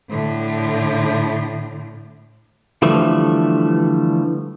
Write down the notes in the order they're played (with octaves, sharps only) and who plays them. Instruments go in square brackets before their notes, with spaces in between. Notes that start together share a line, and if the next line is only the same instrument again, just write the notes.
[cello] A2 D3
[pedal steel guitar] D3 E3 F3 G3 A3